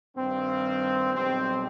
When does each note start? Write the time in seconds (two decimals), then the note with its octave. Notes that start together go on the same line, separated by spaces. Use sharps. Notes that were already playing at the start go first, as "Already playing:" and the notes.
0.16 G2 D#3 G3 C4
1.14 B1 B2 G3 C4